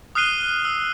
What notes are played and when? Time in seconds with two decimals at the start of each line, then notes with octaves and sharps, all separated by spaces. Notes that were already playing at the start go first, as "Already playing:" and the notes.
0.15 D#6 F6 F#6 C7 D#7 G7
0.65 E6